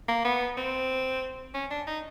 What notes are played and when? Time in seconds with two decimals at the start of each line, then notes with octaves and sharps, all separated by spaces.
0.09 A#3
0.25 B3
0.57 C4
1.54 C#4
1.71 D4
1.87 D#4